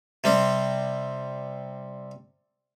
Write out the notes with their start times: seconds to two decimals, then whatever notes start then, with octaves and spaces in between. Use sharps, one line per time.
0.24 C3 G3 C4